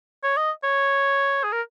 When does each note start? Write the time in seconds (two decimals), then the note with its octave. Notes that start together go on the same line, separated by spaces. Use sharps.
0.24 C#5
0.37 D#5
0.64 C#5
1.44 G#4
1.52 A#4